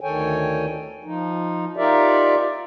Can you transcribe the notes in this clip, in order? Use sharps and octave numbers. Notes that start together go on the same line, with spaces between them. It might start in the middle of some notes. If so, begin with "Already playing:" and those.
D2 D#3 A4 C#5 G5 G#5
F3 D#4
D#4 F4 G4 A#4 D5 E5